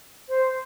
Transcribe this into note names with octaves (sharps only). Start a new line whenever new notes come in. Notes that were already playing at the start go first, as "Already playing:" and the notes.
C5